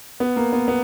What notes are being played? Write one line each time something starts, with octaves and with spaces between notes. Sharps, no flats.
B3
A#3
B3
B3